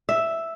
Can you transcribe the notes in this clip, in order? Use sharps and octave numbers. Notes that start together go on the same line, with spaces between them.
E5